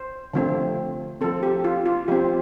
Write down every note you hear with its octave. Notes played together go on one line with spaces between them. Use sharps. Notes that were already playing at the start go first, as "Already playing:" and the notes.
Already playing: C5
D3 F3 A3 C4
F3 C4 A4
G4
F4
F4
F3 C4 G4